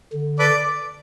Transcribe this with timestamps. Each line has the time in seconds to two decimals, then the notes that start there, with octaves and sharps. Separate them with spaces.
0.13 D3
0.39 A4 B4 D5